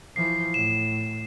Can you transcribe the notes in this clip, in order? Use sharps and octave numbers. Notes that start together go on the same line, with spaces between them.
E3 F3 C7
A2 E7